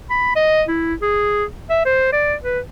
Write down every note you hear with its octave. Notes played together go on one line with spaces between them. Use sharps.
B5
D#5
E4
G#4
E5
C5
D5
B4